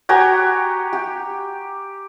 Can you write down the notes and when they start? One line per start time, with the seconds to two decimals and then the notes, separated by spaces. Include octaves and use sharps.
0.09 F#4 G4 G#5 A#5
0.93 G4